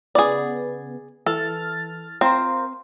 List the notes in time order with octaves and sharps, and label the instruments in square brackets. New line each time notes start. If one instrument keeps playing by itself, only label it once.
[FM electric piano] C#3 B3 [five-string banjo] G#4 D5
[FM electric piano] E3 F6 A6 [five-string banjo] A4
[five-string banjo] C4 [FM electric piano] F4 A#4 C5